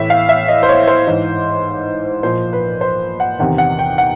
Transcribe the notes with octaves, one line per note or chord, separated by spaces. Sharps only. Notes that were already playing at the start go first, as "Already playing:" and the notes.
Already playing: A2 E3 E5
F5
E5
D#5
C5
C#5
C5
G#2 E3
A#2 F3 C5
B4
C5
F#5
E2 C3 D#3 F#5
F#5
G5
F#5